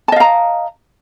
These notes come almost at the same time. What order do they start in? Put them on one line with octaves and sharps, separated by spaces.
A5 D#5 F5 A#5